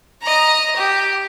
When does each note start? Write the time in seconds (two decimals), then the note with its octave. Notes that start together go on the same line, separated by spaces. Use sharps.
0.22 D#5 A#5
0.76 G4